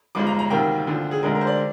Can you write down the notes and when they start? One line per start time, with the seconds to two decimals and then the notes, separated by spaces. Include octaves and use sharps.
0.15 G1 G2 F3 G#3 D6
0.27 A#5
0.39 A#5
0.50 D2 C3 D#3 G3 A#3 G5
0.87 D2 D3 F3
1.11 G#4
1.23 D2 D3 G#3 A#4
1.35 A#4
1.41 C5
1.47 D5